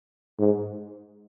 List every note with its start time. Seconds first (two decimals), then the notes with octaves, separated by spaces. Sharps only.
0.39 G#2